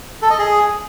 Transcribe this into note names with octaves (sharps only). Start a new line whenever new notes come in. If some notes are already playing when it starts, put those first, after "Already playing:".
A4
D#5
G#4